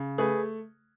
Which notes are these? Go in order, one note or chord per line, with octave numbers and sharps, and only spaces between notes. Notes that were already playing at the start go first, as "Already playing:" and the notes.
Already playing: C#3
A3 G#4 B4